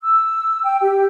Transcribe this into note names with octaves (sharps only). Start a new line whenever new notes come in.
E6
G5
G4